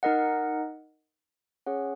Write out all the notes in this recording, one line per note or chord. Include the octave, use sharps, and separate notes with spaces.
D#4 A#4 D#5 F#5
C#4 G#4 C#5 F#5